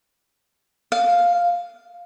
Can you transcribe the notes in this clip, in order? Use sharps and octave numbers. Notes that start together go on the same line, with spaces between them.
F5